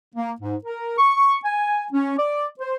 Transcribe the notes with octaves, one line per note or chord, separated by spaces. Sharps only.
A#3
G#2
A#4
C#6
G#5
C#4
D5
C5